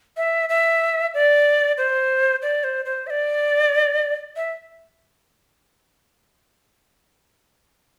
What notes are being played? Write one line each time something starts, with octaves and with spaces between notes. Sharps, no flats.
E5
E5
D5
C5
D5
C5
C5
E5
D5
E5